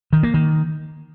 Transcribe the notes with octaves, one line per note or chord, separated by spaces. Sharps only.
D#3
A#3
D#3